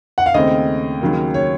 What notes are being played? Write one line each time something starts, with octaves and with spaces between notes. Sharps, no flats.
F#5
F5
D#2 C#3 A3 C4 D#5
D#2 C#3 F#3 A#3
C#5